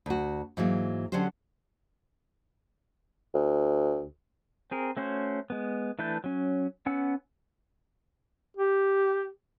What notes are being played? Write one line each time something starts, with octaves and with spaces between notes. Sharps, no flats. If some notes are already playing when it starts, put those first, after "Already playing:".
D2 F#4
G#2 E3 F#3 A#3
D3 F#3 C#4 D4 G4 C5
D2
C4 G#4 A#4
A3 C#4 F#4 C5
G#3 B3
E3 A3 D4 B4 G6
F#3 C#4
B3 C#4 F#5 E6
G4